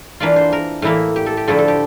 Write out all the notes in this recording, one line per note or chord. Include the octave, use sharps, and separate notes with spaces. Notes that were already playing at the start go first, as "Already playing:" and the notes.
E3 A#3 D4 F4 D5
C5
A#4
A2 E3 A#3 E4
G4
A4
G4
D3 F3 A3 E4 A4
A4
G4